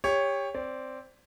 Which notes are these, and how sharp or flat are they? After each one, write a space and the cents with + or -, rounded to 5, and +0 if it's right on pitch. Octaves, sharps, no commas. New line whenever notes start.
G4 +25 C#5 +0
C4 +0 D5 -15